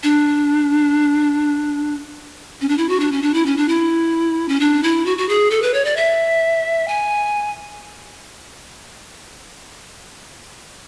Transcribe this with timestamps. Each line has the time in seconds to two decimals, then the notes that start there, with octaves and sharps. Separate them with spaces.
0.03 D4
2.61 C#4
2.69 D4
2.78 E4
2.89 F#4
3.00 D4
3.12 C#4
3.22 D4
3.34 E4
3.46 C#4
3.57 D4
3.68 E4
4.49 C#4
4.60 D4
4.83 E4
5.06 F#4
5.18 F#4
5.29 G#4
5.51 A4
5.62 B4
5.74 C#5
5.85 D5
5.97 E5
6.88 G#5